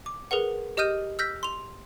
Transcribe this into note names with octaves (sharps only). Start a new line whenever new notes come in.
D6
G#4 A#4 B4 F#5
G4 D#5 D#6 F6 G6 D#7
E6 F6 G6 A#6 B6
C6 F7